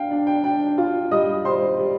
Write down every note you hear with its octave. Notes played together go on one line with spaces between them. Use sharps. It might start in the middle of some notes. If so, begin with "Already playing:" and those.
Already playing: D4 F5 G5
D4
G5
D4 G5
F4
G3 D#5 D#6
G3 C5 C6
G3